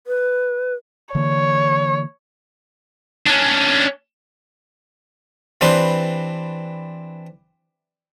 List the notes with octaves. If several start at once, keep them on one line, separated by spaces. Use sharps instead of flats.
B4
D3 E3 A#3 C#5
C#4 D4
E3 C4 D4 G4 B4 C5